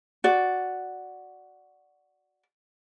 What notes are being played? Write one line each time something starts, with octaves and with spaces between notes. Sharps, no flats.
F#4 D5